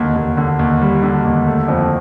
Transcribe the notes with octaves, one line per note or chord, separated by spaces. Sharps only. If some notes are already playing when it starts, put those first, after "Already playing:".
Already playing: D#2 D3
D#2
D3
D#2
G3
D3
D#2
A3
F2